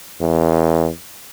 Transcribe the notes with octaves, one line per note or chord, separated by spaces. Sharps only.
E2